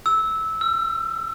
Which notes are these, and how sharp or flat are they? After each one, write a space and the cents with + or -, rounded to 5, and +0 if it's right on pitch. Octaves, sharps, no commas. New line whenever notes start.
E6 -15
E6 +35